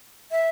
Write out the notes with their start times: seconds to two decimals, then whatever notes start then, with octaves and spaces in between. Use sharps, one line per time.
0.32 E5